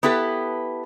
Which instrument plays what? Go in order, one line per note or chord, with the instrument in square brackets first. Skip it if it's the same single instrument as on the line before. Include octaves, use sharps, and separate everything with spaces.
[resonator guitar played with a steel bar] B3 E4 G4 A4 B4